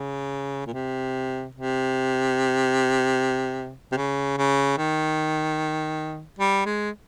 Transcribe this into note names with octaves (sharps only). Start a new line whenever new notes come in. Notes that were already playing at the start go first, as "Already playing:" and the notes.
Already playing: C#3
A#2
C3
C3
C3
C#3
C#3
D#3
G3
G#3